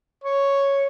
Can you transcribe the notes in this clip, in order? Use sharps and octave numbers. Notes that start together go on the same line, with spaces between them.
C#5